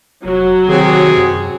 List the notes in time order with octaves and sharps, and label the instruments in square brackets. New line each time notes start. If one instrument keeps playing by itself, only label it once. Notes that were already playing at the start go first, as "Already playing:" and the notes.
[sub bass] F1 [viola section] F#3
[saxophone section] C3 G#4 [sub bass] D#3
[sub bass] F#2